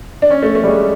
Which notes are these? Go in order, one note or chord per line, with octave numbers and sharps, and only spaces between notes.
D4
C#4
A3
A3
G3
G#3